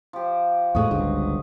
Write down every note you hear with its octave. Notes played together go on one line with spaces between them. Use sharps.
F3 G4
E2 A2 G#3 F#4 D#5
G1 C#2 G2